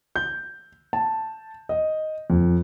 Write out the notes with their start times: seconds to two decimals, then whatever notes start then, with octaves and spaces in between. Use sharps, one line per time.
0.16 G6
0.93 A5
1.69 D#5
2.30 F2